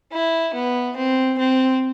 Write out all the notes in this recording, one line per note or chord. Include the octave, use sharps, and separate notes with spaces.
E4
B3
C4
C4